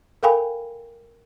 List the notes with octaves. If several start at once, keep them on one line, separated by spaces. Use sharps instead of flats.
A4 A#4 F5 G5 G#5 B5